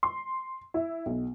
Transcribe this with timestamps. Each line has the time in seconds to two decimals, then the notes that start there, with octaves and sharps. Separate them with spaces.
0.03 C6
0.74 E4
1.06 B1